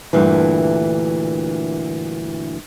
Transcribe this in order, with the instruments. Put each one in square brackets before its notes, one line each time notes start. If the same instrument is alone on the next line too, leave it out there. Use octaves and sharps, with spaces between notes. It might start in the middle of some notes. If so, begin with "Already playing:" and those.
[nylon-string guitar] D2 G2 A#2 E3